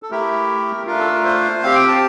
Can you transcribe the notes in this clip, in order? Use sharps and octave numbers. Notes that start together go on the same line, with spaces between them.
A4
A3 E4 G4 A#4
A3 D4 F4 A#4
A4
A#4
C5
C4 G4 F5
G5
A5